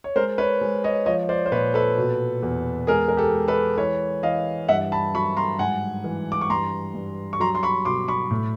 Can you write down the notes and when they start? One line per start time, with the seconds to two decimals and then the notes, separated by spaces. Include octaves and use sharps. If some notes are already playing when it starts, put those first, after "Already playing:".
0.04 C#5
0.16 G#3 A#4 C5
0.38 B4 C#5
0.61 G#3
0.84 C#5 D#5
1.06 F3 C#5 D#5
1.29 C5 D5
1.46 C5
1.51 A#2 B4 C#5
1.74 A4 B4
1.98 B2
2.43 E2
2.87 G#3 G#4 A#4
3.08 A#4
3.17 G4 A4
3.33 G#3
3.48 A4 B4
3.78 E3 B4 C#5
4.23 E3 D#5 F5
4.69 G2 E5 F#5
4.92 A5 B5
5.14 F#3 B5 C#6
5.36 A#5 C6
5.59 G#2 F#5 G#5
6.04 E3
6.32 D6
6.41 C#6
6.50 G2 A#5 C6
6.95 G2
7.33 C#6
7.40 F#3 A#5 C6
7.55 C6
7.63 B5 C#6
7.85 B2 C6 D6
8.08 B5 C#6
8.31 A2